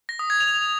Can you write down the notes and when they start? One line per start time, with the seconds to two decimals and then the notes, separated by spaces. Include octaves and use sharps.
0.09 A#6
0.19 D#6
0.30 G#6
0.40 F7